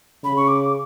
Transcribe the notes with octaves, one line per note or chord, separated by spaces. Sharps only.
C#3 B5
C#6
D6